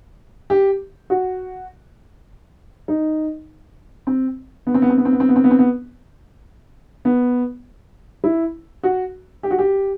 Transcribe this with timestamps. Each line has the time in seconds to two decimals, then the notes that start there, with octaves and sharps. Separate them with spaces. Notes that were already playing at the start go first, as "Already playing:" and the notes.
0.50 G4
1.10 F#4
2.88 D#4
4.07 C4
4.67 B3
4.74 C4
4.82 B3
4.89 C4
4.98 B3
5.05 C4
5.12 B3
5.20 C4
5.29 B3
5.36 C4
5.44 B3
5.51 C4
5.59 B3
7.05 B3
8.24 E4
8.83 F#4
9.43 G4
9.51 F#4
9.59 G4